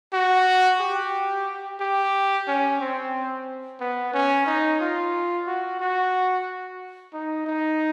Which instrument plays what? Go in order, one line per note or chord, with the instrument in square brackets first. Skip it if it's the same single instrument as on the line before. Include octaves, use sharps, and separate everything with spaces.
[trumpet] F#4
G4
G4
C#4
C4
B3
C#4
D#4
F4
F#4
F#4
D#4
D#4